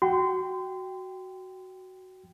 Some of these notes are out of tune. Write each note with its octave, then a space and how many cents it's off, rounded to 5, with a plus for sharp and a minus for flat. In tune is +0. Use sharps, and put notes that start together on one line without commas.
F#4 +10 G5 +0 C6 -30